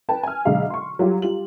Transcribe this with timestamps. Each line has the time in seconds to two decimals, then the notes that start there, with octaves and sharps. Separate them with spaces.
0.09 B4 G5 A5
0.23 G#5 F6
0.45 B1 D3 G#3 E5 F5
0.70 C6 C#6
0.99 F#3 G3 F4 G4
1.22 G3 F4 F#7